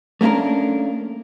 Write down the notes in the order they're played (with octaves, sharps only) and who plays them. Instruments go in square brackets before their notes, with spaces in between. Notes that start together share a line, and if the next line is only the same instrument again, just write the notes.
[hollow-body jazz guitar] A3 A#3 C#4 D4 A#4